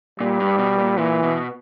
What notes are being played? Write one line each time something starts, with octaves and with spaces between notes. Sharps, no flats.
A#2 G3
G2
B2
A#2
A#2 E3
B2